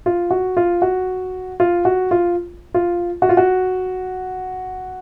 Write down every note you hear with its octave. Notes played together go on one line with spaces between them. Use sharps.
F4
F#4
F4
F#4
F4
F#4
F4
F4
F#4
F4
F#4